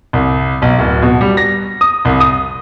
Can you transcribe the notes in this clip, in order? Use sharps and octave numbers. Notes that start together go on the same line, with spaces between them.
C2
B1
D1
B2
G3
A#6
D#6
C2
D#6